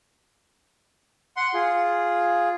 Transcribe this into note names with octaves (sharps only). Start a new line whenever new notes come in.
F#5 C6
F4 G#4